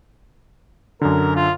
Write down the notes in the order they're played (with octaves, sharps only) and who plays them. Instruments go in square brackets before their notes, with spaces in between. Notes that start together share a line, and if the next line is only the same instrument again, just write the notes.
[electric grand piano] F#2 D3 [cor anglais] A#4
[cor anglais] F4